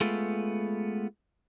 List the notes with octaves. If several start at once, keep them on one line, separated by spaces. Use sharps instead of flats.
G#3 A3 B3 F4